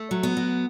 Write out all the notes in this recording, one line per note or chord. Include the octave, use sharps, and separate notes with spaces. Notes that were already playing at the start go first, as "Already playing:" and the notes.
Already playing: A3
F#3
B3
F#3